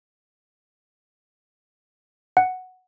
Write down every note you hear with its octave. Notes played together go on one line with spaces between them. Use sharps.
F#5